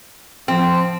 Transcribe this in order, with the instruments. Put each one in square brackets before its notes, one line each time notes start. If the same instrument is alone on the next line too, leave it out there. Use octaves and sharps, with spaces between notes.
[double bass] F3 [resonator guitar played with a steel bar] C4